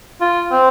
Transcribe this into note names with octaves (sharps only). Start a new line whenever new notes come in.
F4
C4